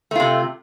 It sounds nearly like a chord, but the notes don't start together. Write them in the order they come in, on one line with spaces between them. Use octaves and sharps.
A3 F4 C3